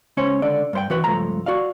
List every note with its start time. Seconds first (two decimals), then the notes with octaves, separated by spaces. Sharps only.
0.17 C#2 C#4 C5 C#5
0.42 C#2 D3 D5
0.73 G2 C5 G5
0.90 E3 F#4 B4
1.04 C#2 G2 F3 A3 A#5
1.46 F#4 D5 F5